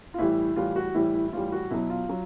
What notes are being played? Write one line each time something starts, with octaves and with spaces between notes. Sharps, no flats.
F4
A2 E3 G3 E4
A2 E3 G3 F4
F#4
A2 E3 G3 E4
E4
E4
A2 E3 G3 F4
F#4
B2 F#3 E4
F4
F#3